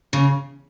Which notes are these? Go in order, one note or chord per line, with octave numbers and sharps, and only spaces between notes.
C#3